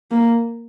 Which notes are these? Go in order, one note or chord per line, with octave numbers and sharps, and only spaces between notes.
A#3